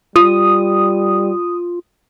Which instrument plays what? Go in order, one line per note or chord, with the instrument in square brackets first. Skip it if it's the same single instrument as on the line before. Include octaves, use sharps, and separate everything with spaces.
[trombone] G3 [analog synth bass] F4 [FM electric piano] D#6